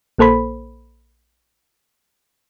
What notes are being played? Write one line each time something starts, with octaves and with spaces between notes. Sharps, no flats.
A#1 A#3 A4 C5 B5